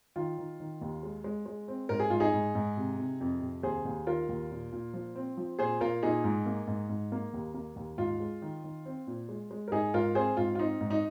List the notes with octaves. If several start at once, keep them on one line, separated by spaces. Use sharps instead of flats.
D#3 F4
D#3
D#3
D#2
G#3
G#3
G#3
C4
G#2 A#4
G#4
G#2 F4
D#4 G#4
G#2
G#2
C3
C3
F2
C3
D#2 G#4 C5
D#2
D#3 F4 A#4
D#2
A#2
A#2
F3
C4
F3
A#2 G#4 C5
A#2 F4 A#4
A#2 D#4 G#4
G#2
A#3
G#2
G#2
A#3
D#2
A#3
D#2
G#2 F4
G#3
D#3
D#3
C4
A#2
G#3
G#3
A#4
G#2 D#4 G#4
G#2 F4 A#4
C4 G#4 C5
G#2 F4
F4
C4 D#4
G#2
D#4